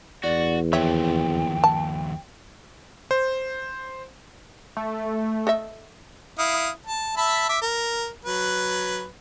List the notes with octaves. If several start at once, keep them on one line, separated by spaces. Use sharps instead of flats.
E2 F#4 D5
D#2 F3 C#5 E5 G5
A5
C5
A3
A4 D#5 E5
E4 F5 D#6
A5
E5 A5 B5
E5 D6
A#4
F#3 B4